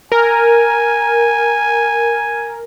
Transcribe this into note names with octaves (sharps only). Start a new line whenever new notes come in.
A#4 G#5